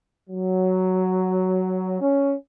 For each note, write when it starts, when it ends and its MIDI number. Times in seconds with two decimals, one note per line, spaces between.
0.30 1.97 54
2.01 2.34 61